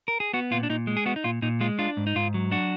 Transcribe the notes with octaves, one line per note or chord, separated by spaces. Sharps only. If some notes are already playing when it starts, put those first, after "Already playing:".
A#4
G#4
B3 F#4
A#2 F4
D4
A#2 D#4
G#3
G#4
B3 F#4
D#4
A#2 F4
A#2 D#4
G#3 F4
D4 F4
G#2
D#4
G#2 F4
F#3
D4 F#4